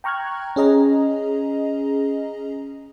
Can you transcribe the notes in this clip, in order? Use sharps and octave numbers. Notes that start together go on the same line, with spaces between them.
G5 A#5 C#6 F6 F#6 G#6
C#4 G#4 D#5 A#5